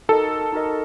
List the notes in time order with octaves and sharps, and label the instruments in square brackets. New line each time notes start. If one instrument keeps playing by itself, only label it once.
[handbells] D#4 F#4 A#4 D#5 [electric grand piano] A4
[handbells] D#4 F#4 A#4 D#5